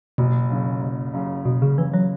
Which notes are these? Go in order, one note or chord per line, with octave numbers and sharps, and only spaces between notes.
F#1 B2
F#2 C#3
F#1
F#2 C#3
F#1 B2
C#3
F#2 C#3 E3
F#3